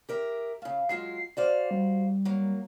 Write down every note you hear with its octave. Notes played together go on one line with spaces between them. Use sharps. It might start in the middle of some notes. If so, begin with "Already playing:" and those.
G4 A#4 E5
C#3 A3 F5
F#3 G#3 F4 C7
F#4 C5 D5 F5
G3
F#3 A#3